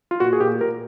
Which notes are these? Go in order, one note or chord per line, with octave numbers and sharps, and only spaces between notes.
F4
A#2 F#4
G#4
A#2 G4
A#2 A#4